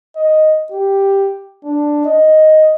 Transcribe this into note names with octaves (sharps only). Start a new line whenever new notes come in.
D#5
G4
D4
D#5